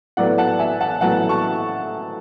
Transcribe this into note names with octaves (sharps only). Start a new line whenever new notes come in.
A2 F#3 B3 D5 F#5
F#5 A5
E5 G#5
F#5 A5
A2 F#3 B3 F#5 A5
A5 C#6